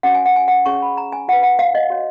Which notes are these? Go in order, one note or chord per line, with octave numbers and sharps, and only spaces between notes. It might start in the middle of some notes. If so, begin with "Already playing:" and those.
C#4 F#4 C#5 F#5
G#5
F#5
G#5
F#5
C#4 G#4 C#5 C#6
B5
A#5
G#5
F4 B4 F#5
F#5
F5
D#5
F#4 C#5